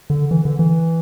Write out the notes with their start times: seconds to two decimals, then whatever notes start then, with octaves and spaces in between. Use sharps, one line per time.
0.10 D3
0.31 E3
0.45 D3
0.59 E3